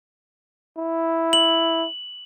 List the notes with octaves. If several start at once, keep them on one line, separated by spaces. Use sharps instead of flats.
E4
F#7